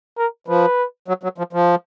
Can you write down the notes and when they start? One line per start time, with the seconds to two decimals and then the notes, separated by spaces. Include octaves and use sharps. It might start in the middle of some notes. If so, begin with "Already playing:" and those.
0.18 A#4
0.48 F3 B4
1.08 F#3
1.23 F#3
1.38 F3
1.53 F3